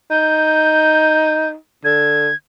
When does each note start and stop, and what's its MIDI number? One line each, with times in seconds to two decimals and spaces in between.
0.10 1.54 63
0.10 1.49 91
1.85 2.29 50
1.85 2.35 92